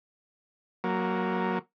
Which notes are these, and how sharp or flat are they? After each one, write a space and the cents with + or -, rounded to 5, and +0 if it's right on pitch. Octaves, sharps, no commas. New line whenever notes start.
F#3 +0 A#3 +0